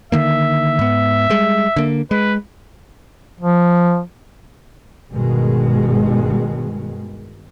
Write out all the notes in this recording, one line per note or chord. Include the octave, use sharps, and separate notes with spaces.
D3 D#3 A#3 E5
G#2 B3
G3 G#3
D3 A#3
G#3 B4
F3
G1 G2 B2 D#3 G#3